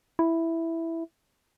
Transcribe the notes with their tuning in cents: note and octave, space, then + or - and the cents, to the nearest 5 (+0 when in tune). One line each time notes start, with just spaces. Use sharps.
E4 +0